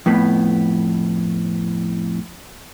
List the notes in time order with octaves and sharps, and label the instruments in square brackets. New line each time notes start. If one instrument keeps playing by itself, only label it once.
[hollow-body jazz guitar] F2 A2 B3